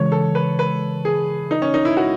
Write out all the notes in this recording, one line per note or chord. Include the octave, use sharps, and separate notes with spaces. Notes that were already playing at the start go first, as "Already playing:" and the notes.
Already playing: C#3 E3 G#3 C#5
A4
B4
B4
G#4
D#4
C#4
D#4
E4
F#4